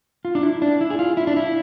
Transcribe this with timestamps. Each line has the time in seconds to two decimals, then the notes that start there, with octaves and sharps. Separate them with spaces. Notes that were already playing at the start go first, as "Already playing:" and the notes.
0.25 F4
0.35 D4
0.43 E4
0.62 D4
0.81 E4
0.90 G#4
0.99 F4
1.17 E4
1.27 D4
1.37 E4